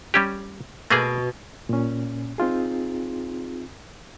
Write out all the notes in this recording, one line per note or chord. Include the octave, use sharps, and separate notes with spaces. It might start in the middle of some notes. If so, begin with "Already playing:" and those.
G3 C#4 G4
B2 A3 A#3 G#4
A#2 C#4
C4 D#4 F4 G#4